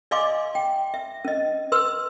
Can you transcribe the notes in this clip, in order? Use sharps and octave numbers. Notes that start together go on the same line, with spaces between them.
D5 D#5 F5 G#5 C6 D6
G5
E5
C#4 D#5
B4 C6 E6